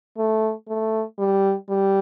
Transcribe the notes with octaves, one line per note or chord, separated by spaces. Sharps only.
A3
A3
G3
G3